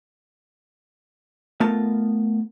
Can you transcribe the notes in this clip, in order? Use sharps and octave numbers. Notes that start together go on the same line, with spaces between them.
A3 B3 F4 A#4 A5